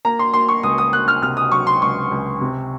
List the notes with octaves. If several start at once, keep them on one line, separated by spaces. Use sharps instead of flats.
A#3 A#5
C6
A#3 C6
C#6
C#2 D#6
D#6
A#3 F#6
F6
C3 F6
D#6
F#3 C#6
C6
C#2 C#6
C#2
C3